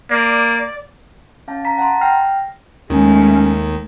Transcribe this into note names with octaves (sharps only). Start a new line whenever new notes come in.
A#3 D5
C#4 F5 A5
A#5 B6
F#5 A5 A#5 C6
G5 F6 A#6 C7
D#2 D#3 G#3 A3 C#4